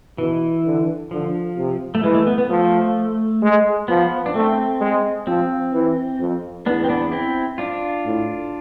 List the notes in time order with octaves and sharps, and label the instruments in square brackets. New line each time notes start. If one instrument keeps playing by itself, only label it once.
[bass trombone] B2 [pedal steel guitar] E3
[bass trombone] D3
[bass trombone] D3 [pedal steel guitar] F3
[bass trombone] C3
[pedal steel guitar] A3
[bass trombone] E3 [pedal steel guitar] G#3
[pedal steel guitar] A3
B3
B3
[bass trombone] F3 [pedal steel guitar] A3
[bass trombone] G#3
[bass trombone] F3 [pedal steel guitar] B3
[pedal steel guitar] D4
[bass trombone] A3 [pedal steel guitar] C4
[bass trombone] G#3
[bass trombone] F3 [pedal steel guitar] C4
[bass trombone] E3
F2
[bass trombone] E2 [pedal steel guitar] B3 D4
[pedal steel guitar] C4
B3 D4
C4 E4
D4 F4
[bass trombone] A2